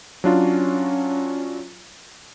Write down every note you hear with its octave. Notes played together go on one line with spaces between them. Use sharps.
F#3 C#4 D4 F4